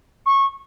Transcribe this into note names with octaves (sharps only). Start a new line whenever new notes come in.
C#6